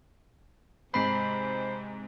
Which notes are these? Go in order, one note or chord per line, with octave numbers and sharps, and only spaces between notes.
G#2 C3 G#3 C4 C5 B5 C7